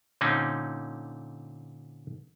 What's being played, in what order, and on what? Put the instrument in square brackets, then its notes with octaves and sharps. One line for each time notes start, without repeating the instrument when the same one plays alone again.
[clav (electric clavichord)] A#2 D3 C4 C#4 D#4